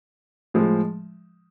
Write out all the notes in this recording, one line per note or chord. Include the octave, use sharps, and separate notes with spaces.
A2 F3 G#3